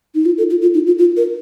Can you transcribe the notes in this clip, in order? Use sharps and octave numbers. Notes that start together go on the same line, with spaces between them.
D#4
F4
A4
F4
F4
D#4
F4
F4
A#4